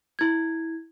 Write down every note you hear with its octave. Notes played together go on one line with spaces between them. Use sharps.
E4 G#6